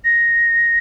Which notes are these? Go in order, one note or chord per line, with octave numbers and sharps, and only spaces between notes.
A#6